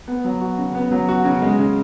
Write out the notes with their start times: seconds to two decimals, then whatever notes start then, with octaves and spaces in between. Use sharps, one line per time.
0.08 B3
0.25 F#3
0.41 F#4
0.58 C#3
0.75 B3
0.92 F#3
1.09 F#4
1.25 C#3
1.42 G#3
1.59 C#3